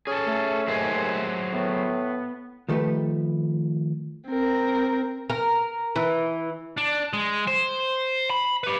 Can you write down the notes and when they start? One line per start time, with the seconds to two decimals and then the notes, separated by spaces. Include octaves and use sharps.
0.07 C#4 G#4 A4
0.26 A3
0.68 D#2 F#3 G#4 C5
1.53 A2 B3
2.68 D#3 F3 A3 G4 B4
4.29 C4 A#4
5.30 A#4
5.96 E3
6.77 D4
7.13 G#3
7.47 C5
8.30 B5
8.64 G4 B4